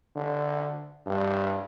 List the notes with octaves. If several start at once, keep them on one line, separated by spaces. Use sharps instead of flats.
D3
G2